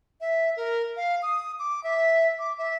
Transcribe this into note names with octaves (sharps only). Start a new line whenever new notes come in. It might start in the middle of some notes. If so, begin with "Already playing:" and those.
E5
A#4
F5
D#6
D6
E5
D6
E5